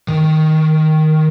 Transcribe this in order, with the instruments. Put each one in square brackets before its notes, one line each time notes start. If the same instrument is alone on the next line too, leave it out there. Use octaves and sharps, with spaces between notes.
[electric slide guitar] D#3